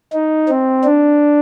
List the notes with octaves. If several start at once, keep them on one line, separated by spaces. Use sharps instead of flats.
D#4
C4
D4